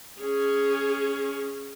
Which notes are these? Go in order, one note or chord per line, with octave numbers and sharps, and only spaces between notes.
C#4 G#4